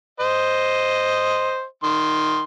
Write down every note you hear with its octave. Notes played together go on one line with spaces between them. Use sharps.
C5 D#5
D#3 C6